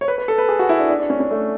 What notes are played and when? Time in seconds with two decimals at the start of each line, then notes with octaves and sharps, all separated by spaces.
0.01 C#5
0.08 B4
0.18 B4
0.28 A4
0.38 B4
0.49 G#4
0.59 F#4
0.69 E4
0.79 D4
0.90 D4
1.00 D4
1.10 C#4
1.20 C#4
1.31 A3